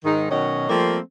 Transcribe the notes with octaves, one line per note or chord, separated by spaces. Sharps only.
G#2 D#3 D#4
B2 D#3 F#3 C#4 C#5 D#5
F3 G3 A3 A#3 C4